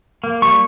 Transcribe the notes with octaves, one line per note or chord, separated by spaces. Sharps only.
A#3
G3 C#6